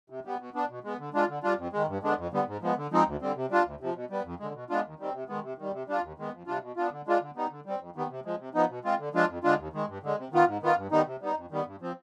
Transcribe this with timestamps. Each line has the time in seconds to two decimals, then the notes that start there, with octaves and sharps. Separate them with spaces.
0.10 C3
0.25 G3 B3
0.40 B2
0.54 B3 D4
0.69 B2
0.84 G#3 B3
0.99 D3
1.14 G#3 D4 F4
1.29 D3
1.43 G3 D4 F4
1.58 F2
1.73 D#3 G#3
1.88 G2
2.02 D3 G#3 B3 D4
2.18 F2
2.32 D3 G3 B3
2.47 G#2
2.62 F3 G#3 B3
2.77 D3
2.92 F3 G#3 C4 D#4
3.07 D2
3.22 D3 G3 C4
3.36 C3
3.50 G3 D4 F4
3.65 D2
3.80 C3 F3
3.95 B2
4.10 G3 B3
4.25 F2
4.40 D3 G#3
4.54 B2
4.70 G#3 B3 D4 F4
4.84 D#2
4.99 D#3 G3 C4
5.14 C3
5.28 D#3 G#3 B3
5.43 C3
5.58 D#3 G3
5.73 C3
5.88 G3 D4 F4
6.03 D#2
6.18 D#3 G#3 B3
6.33 F2
6.47 C3 G3 D4 F4
6.62 B2
6.77 B3 D4 F4
6.92 D3
7.07 G#3 D4 F4
7.21 D3
7.36 G3 B3 D#4
7.50 D3
7.66 G3 C4
7.80 F2
7.96 D#3 G3 B3
8.10 C3
8.25 F3 G#3
8.39 C3
8.54 F3 B3 D#4
8.69 B2
8.84 G#3 C4 F4
8.99 D3
9.14 F3 G#3 D4 F4
9.29 F2
9.44 D3 G#3 D4 F4
9.58 D#2
9.73 D#3 G#3
9.88 G2
10.03 D3 G#3
10.18 C3
10.32 D#3 B3 F4
10.48 G#2
10.62 D#3 B3 F4
10.77 G2
10.91 D#3 G3 B3 D#4
11.06 C3
11.21 G3 B3 D#4
11.36 F2
11.51 D#3 G3 B3
11.66 G2
11.81 F3 C4